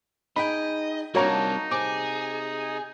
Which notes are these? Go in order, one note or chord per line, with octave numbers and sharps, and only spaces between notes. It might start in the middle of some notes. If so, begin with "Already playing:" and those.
D#4 G#4 D#5 G5 B5
G3 A#3 C4 D4 D#4 F#4 C#5 A#5
C3 G#4 D6